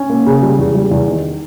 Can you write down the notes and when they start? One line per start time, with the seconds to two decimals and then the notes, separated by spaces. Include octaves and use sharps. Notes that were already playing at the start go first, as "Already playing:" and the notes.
Already playing: C#4
0.10 A#3
0.26 C#3
0.42 G3
0.58 E2
0.75 G3
0.91 E2
1.07 D#3